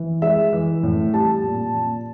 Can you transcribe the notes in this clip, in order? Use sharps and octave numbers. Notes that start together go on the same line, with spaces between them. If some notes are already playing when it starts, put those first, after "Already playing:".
Already playing: E3
G#3 E5
E3
A2
G3 A5
A#2
A#2